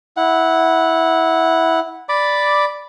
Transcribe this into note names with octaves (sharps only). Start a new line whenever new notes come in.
E4 F#5
D5 B5 D6